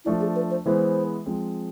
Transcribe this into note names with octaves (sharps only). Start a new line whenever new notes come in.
F3 A3 D4 E4
G#4
B4
C5
E3 G#3 B3 E4 C5
F3 G#3 C4